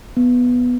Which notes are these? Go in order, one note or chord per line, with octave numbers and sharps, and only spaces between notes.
B3